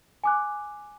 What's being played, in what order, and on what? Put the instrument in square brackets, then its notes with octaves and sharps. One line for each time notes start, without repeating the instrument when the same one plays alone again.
[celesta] G#5 D6 F#6